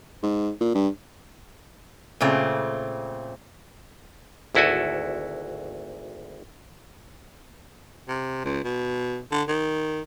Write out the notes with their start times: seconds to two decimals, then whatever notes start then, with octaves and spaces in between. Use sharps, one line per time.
0.23 G#2
0.61 A#2
0.75 G2
2.21 A#2 C#3 A3 C4
4.55 G#1 D2 E4 F#4 A4 G#5
8.08 C3
8.44 C#2
8.64 B2
9.32 D3
9.48 D#3